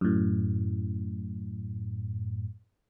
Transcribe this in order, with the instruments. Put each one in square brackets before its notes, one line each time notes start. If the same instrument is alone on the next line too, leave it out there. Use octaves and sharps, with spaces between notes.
[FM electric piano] F#2 A2